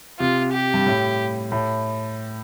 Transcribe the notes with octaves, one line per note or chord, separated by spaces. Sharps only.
C3 F4
G4
G2
A2
A2